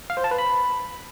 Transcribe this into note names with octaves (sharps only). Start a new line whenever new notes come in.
F5
C5
A5
B4
B5